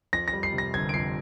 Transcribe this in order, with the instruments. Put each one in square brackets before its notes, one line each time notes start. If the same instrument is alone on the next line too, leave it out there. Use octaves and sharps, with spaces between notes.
[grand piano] F2 A#6
A#6
G3
C7
C3
A#6
G1 G#6
D7
F2 C7